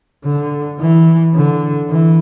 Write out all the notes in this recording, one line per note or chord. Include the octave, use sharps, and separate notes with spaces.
D3
E3
D3
E3